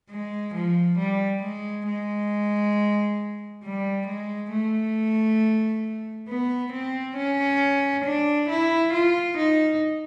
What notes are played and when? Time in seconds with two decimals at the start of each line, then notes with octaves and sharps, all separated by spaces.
0.10 G#3
0.55 F3
0.98 G3
1.42 G#3
1.86 G#3
3.64 G3
4.07 G#3
4.51 A3
6.28 B3
6.72 C4
7.17 C#4
8.05 D4
8.49 E4
8.93 F4
9.37 D#4